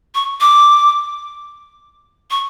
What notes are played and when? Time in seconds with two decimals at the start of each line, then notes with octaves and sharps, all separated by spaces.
0.15 C#6
0.41 D6
2.31 C#6